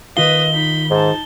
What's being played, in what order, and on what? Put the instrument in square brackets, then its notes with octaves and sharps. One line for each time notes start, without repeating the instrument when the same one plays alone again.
[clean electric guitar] D#3 F4 F5 [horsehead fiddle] B4 D#5 [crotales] G7
[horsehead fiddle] D#4 B5
[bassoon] G#2 [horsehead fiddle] D#4 A5